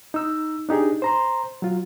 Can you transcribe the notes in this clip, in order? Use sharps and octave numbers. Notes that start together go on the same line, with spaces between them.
D#4 E6
D4 D#4 G4 G#4
C5 A#5 C6
F#3 F4